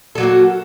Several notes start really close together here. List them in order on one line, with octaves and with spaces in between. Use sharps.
A4 F#3 A#3 F#4